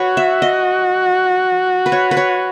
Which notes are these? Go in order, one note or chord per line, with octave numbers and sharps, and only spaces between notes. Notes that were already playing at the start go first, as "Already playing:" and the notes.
Already playing: F#4 B4 C#5
E5
D#5
B4
C#5
B4
C#5